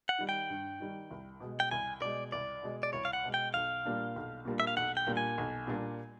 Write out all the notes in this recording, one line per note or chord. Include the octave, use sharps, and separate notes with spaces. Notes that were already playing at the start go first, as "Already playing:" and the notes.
F#5
D#3 G3
G5
G2
D#3 G3
C2
B2 G#3
G5
C2 G#5
B2 G#3 D5
C2 D5
B2 G#3
D5
C2 C#5
F5
F#5
B2 G#3
G5
B1 F5
A#2 G3 A#3 D4
B1
A#2 G3 A#3 D4
E5
F5
B1 F#5
G5
A#2 G3 A#3 D4
G#5
B1
A#2 G3 A#3 D4